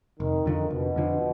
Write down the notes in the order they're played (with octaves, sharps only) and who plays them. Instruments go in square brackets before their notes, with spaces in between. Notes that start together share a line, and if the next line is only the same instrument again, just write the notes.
[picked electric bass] F1 [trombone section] D#3
[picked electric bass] F2 D3 F3
[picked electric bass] F1 [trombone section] B2
[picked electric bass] F2 D3 F3